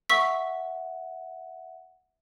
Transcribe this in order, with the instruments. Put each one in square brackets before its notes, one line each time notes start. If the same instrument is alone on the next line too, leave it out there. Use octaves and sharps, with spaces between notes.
[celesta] E5 F#5 [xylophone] C#6 E6 B6